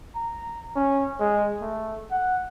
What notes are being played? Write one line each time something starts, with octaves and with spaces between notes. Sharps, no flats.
A#5
C#4
G#3
A3
F#5